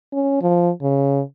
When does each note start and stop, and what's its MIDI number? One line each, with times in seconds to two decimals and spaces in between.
0.12 0.39 61
0.41 0.70 53
0.82 1.21 49